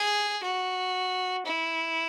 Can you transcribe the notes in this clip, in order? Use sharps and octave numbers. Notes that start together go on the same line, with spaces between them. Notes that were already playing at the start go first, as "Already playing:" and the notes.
Already playing: G#4
F#4
E4